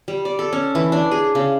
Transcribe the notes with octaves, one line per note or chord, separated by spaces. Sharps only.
G3
D5
A4
C#4
E3
D4
G#4
C#3